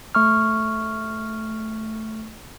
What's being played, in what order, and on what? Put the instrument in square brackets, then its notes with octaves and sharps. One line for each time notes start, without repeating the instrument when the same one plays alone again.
[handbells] A3 C#6 F6